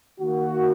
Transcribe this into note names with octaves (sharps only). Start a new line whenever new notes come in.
D#3 A#3 F#4